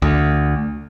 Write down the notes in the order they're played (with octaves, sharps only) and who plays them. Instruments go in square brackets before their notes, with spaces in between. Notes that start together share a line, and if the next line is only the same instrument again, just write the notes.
[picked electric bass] D2